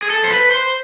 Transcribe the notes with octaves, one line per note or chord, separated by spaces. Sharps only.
G#4
A4
C5
B4
C5